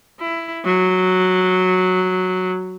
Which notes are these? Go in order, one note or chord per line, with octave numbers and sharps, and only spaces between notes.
E4
F#3